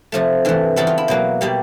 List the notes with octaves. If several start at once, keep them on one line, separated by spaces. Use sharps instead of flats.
C3 F3 A3
G2 E3 A3
C#3 E3 G3 B3 A4
F4
E4
B2 F#3 A#3
B2 G3 A#3 G4